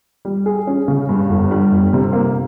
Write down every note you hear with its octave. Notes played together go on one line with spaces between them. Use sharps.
G3
G#4
C#4
C#3
G2
G1
G3
G1
C3
A#3